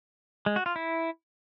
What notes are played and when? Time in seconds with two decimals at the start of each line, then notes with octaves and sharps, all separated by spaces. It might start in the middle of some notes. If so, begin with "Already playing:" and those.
0.46 G#3
0.56 F#4
0.66 F4
0.76 E4